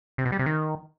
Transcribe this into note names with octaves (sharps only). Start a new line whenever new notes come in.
C3
B2
G3
C3
D#3